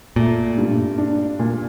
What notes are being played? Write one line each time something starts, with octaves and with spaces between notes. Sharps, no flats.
A#2 A3
G2
D4
A#2